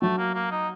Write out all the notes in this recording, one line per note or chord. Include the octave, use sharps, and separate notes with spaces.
F#3 A3
A#3
A#3
D#4